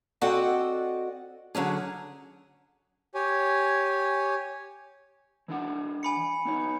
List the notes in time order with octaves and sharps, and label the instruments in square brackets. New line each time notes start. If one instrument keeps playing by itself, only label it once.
[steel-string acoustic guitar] C4 F#4 A4 D5 D#5 F#5
D3 F#3 C#4 G#4
[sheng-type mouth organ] G4 C#5 G#5
[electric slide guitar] E3 D4 F#5
[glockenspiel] G#5 B5 C#7
[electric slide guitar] B3 D#4 C#5